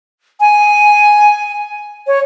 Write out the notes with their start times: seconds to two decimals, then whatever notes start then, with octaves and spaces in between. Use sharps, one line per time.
0.40 G#5
2.07 C#5